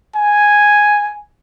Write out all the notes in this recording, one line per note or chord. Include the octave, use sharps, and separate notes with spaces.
G#5